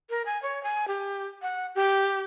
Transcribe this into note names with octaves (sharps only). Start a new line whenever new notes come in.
A#4
G#5
C#5
G#5
G4
F#5
G4